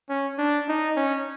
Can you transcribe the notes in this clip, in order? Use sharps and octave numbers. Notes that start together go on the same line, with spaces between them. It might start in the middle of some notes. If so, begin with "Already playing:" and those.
C#4
D4
D#4
C#4